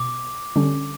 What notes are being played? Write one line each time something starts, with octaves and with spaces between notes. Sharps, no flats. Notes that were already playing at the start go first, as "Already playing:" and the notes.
Already playing: B2 D6
D3 G3 C#4